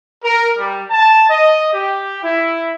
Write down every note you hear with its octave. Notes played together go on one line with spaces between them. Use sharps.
A#4
G3
A5
D#5
G4
E4